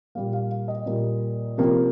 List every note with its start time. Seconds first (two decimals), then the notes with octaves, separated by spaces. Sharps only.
0.15 A#2 G3 A#3 F5
0.33 F5
0.51 F5
0.68 D#5
0.86 A#2 G3 A#3
1.58 C3 F3 A#3